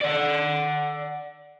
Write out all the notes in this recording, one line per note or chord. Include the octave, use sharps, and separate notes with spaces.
D5 F#5